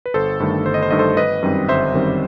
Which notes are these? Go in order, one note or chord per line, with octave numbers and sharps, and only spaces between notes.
B4
G1 A4 C5
G2 D#3 A3
G1 C5
D#5
C5
G2 D#3 A3 D#5
A4 C5
G1 B4 D#5
F#2 D#3 G3 C4
G1 C5 E5
F#2 D#3 G3 C4